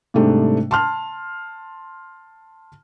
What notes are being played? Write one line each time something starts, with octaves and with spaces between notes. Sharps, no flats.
G#2 C3 G3 A3 D4
A5 C6 F6